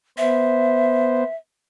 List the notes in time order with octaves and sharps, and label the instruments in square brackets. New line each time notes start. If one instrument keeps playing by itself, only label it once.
[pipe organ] B3 C5 [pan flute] E5